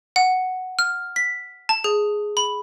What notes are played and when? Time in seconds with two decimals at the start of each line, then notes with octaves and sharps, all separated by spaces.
0.16 F#5
0.79 F6
1.16 B6
1.69 A5
1.84 G#4
2.37 B5